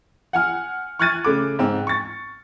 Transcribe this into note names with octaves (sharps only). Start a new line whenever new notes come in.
F#5 G#5 F6
C#6 F6 F#6 G#6 A6 D#7
C#3 A3 D6
G#2 C4
C#6 A6